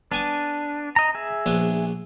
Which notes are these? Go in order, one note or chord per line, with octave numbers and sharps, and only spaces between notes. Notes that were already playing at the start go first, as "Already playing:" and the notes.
B3 D4 G#5 A5
D#5 A#5
G#4 E5
A#1 B3 D4